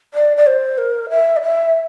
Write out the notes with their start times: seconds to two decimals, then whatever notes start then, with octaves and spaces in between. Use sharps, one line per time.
0.14 D5
0.37 D5
0.47 C5
0.78 A#4
1.10 E5
1.37 D5
1.42 E5